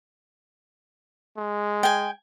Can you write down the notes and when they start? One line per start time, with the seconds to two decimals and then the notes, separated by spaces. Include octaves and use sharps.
1.37 G#3
1.83 G5 G#5